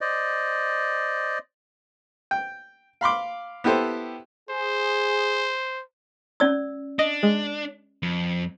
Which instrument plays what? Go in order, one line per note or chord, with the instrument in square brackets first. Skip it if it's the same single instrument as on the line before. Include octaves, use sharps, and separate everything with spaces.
[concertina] C5 D5 D#5
[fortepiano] G5
F5 B5 C6 D6
B3 E4 G4 A4 C5
[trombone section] G#4 [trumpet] C5
[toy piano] C#4 D5 E6
[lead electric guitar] D4 [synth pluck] D#5
[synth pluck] G#3
[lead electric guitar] F2